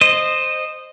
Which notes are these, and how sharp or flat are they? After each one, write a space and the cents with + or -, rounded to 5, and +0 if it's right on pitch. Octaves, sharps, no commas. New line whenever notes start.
C5 +0 D#5 -15